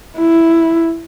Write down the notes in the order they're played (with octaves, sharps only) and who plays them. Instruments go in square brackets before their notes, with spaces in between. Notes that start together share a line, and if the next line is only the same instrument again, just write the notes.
[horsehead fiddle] E4